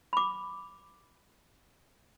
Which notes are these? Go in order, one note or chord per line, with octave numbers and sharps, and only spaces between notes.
B5 D6